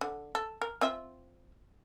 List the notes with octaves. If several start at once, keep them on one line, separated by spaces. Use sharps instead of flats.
D3
A4
A#4
C4 F4 E5